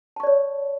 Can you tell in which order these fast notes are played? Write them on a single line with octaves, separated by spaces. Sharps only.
A5 C#6 D5 C#5